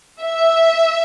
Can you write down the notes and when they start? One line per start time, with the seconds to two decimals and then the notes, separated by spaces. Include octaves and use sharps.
0.21 E5